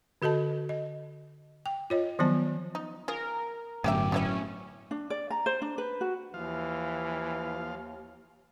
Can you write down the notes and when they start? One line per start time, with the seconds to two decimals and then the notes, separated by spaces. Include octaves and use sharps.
0.22 D3 F#4 A4 D#5 A5
0.69 D#5
1.66 G5
1.90 F4 C#5 D#5
2.19 D#3 F3 F#3 B3 C5 A5
2.75 D#4
3.08 F4 G#4 A#4
3.84 G1 A2 F#3 C#4 G4 E5 G5 D6
4.12 A2 F#3 B3 C#4 E4 E5
4.91 D4
5.10 D5
5.30 A#5
5.46 C5
5.62 D4
5.78 B4
6.01 F#4
6.34 D#2 E3 F3 F5